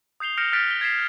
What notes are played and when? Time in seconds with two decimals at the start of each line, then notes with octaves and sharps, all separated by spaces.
0.20 D#6 G6 C7 F7 G7
0.38 F6 G6 A#6 C#7 D7 E7
0.52 F6 F#6 A6 B6 D7
0.68 B6 G7
0.81 G#6 A6 B6 C7 E7